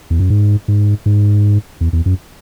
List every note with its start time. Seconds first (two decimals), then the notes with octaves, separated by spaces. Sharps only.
0.10 E2
0.20 F#2
0.30 G#2
0.68 G#2
1.06 G#2
1.81 E2
1.93 E2
2.06 F#2